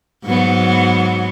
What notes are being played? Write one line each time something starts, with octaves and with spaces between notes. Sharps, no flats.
G#2 F#3 B3